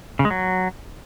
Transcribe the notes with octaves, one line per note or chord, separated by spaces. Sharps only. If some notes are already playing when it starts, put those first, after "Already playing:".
C#3
G#3
F#3